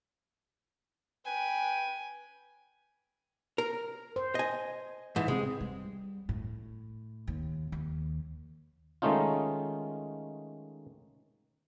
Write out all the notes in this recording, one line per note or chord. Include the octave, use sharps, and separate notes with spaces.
B4 G5 G#5
A#4
C5
D#5 G#5
G#2 E3
C3 G#3 C4
G3
A2
D#2
D#2
D#3 G#3 A3 C#4 D#4 F4